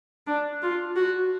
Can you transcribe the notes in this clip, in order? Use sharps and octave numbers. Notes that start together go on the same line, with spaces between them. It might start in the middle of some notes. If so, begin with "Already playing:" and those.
D4
F4
F#4